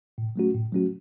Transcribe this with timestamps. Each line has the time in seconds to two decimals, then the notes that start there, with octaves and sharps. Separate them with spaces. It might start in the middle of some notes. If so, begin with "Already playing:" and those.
0.18 A2
0.36 F#3 A3 C#4 F#4
0.54 A2
0.72 F#3 A3 C#4 F#4